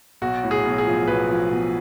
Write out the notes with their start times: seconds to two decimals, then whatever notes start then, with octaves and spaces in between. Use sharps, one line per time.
0.22 B1 F#4
0.44 A2
0.51 G#4
0.65 B1
0.78 G#4
0.87 F3
1.07 B1 B4
1.30 F3
1.51 B1